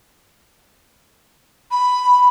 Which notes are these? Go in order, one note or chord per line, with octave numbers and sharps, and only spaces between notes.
B5